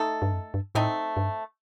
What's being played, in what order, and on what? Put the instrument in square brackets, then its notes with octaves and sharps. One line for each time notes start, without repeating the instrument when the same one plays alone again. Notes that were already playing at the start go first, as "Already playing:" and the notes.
Already playing: [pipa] A3 D#4 A4
[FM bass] G2
F#2
G2
[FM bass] A2 [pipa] A3 C4 D#4
[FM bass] G2